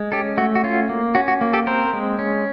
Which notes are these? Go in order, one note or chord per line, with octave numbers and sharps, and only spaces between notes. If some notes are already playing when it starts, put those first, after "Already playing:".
Already playing: G#3
C#4 G4 A4
A3 F#4
F#4
C#4 F4
A#3
C#4 F#4
F#4
A#3
G4 A4
C4 A#4 C5
G#3
C#4